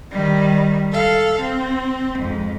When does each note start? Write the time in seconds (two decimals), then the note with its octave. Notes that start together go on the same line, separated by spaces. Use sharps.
0.11 D#3 G3
0.92 A4 F5
1.40 C4
2.18 F2 G#2